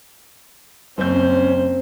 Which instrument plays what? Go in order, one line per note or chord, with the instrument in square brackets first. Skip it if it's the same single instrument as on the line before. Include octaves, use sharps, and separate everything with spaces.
[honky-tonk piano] F#1 G6 [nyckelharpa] C4 C5 [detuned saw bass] C#4